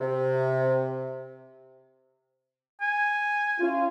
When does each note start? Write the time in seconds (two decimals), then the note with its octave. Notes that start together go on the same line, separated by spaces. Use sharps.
0.01 C3
2.81 G#5
3.60 C#4 E4 F4